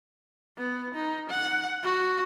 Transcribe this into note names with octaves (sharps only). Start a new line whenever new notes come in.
B3
D#4
F#5
F#4